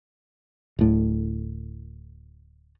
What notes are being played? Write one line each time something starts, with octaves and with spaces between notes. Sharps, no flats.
D1 A2